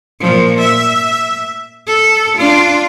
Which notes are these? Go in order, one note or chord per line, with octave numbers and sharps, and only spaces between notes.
A#2 F3
E5
A4
D4 F4